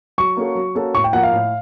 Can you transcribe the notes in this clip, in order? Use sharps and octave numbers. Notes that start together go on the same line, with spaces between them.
F#3 C#6
A#3 C#4 F#4 A4
F#3
A#3 C#4 F#4 A4
A2 C#6
G5
F3 A#3 F#5
F5
A2